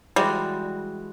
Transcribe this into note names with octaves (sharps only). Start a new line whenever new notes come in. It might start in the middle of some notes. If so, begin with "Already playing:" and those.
E3 G3 G#3 F#4